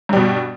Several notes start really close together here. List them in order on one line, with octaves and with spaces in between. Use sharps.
G2 G3 B2